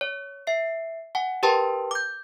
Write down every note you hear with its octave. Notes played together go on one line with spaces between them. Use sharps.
C#5
E5 C7
F#5 G#5
G4 A#4 B4 G5 A5 C6
D6 G6